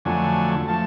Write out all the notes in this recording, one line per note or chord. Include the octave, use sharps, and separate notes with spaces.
F2 D3 F#3 A3 G#5
F3 A3 A5